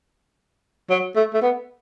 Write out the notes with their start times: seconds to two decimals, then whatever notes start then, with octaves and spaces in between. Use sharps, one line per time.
0.90 F#3
1.16 A3
1.34 A3
1.42 B3